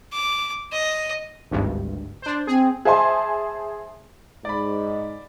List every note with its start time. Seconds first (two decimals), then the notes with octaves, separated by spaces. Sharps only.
0.13 D6
0.72 D#5
1.51 G#1 D2 G2
2.22 D4 C5
2.47 C4 G#4
2.85 G#4 C5 E5 G#5 A5 C6
4.45 G#2 D5 B5